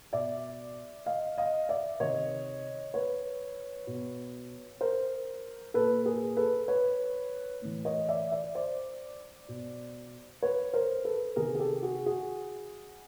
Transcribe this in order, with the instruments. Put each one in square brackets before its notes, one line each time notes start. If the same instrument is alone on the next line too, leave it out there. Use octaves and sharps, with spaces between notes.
[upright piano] B2 D5 E5
D#5 F5
D#5 F5
D5 E5
C3 D#3 C#5 D#5
B4 C#5
B2
A#4 C5
A#2 A4 B4
G#4 A#4
A4 B4
B4 C#5
A2 E3
C#5 D#5
D5 E5
D5 E5
C5 D5
B2
B4 C#5
A#4 C5
A4 B4
C3 D#3 G#4 A#4
G#4
G4 A4
F#4 G#4
F#4 G#4